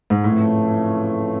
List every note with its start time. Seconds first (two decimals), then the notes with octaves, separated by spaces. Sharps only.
0.10 G#2
0.24 F2 A2 C#3 E3 A3